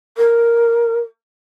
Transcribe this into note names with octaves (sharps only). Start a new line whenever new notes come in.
A#4